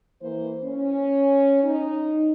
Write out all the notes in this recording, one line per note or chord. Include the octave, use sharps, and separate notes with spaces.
E3 A#3 C5
C#4
D#4